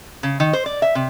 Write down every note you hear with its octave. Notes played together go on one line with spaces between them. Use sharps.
C#3
D#3
C5
D5
E5
C3